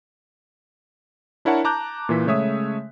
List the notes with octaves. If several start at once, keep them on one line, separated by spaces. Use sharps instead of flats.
D4 E4 A#4 C#5 F#5 A5
A5 A#5 D6 F#6 G6
A#2 E3 B6
C#3 G#3 A3 C#5 E5 D#6